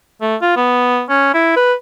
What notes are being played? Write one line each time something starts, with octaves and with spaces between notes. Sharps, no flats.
A3
F4
B3
C#4
E4
B4